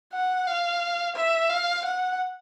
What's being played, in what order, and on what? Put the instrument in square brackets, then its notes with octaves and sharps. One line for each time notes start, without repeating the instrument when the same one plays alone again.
[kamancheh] F#5
F5
E5
F5
F#5